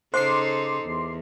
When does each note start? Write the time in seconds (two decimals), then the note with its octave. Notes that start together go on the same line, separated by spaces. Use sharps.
0.14 C#3 D#4 A4 C5 C6 D6 C7
0.84 E2